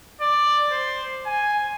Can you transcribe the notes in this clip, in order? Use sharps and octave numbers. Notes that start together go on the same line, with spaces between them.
D5
C5
G#5